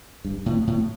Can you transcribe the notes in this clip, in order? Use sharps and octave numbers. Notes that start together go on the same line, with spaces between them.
G2
A2
A2